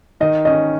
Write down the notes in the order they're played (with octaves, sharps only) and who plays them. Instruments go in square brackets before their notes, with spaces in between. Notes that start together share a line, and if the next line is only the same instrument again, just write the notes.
[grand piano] D#3 [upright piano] D#5
[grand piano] C#4 [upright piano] D#5